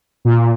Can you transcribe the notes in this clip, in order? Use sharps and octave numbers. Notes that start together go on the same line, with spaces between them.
A#2